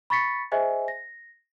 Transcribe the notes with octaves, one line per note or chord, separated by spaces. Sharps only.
B5 C#6 A6 B6 C#7
G#4 C5 D#5 E5 G#5
A#6